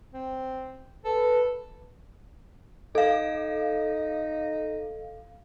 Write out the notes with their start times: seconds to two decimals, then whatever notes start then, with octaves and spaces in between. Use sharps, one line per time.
0.13 C4
1.05 A4 B4
2.95 D#4 A4 F5